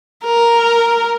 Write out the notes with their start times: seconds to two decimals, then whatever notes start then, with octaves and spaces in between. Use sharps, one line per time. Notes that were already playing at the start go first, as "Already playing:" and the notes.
0.25 A#4